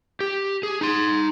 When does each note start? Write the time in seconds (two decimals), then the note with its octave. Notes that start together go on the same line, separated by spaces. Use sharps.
0.21 G4
0.63 G#4
0.81 D#4 C6